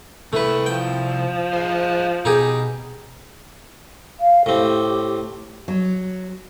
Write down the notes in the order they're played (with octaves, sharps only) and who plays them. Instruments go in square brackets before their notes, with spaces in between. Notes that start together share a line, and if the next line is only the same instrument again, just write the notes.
[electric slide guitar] C3 E4 [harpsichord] A3 B4
[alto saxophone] F3 [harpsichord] G5
[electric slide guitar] G#4 C5
[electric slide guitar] B2 [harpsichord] D#4 G4 G#4
[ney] F5
[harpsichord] A2 C4 [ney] G4
[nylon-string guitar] F#3